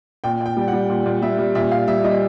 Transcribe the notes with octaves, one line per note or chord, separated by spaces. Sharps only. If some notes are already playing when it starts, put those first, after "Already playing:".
A#2 G5
A#2
G5
G3
F#5
G3
A#2
A#2
G3 E5
G3
A#2 E5
A#2 F5
G3 E5
G3 D#5